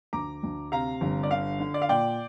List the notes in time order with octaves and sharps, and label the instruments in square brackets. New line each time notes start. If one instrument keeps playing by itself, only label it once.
[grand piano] D2 A#5 D6
D2
C3 F5 A#5
G1
D5
D3 F5
D3
D5
F5
A#2 D5 G5